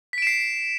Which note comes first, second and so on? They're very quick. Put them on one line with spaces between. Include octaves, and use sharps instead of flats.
B6 D7 E7 C7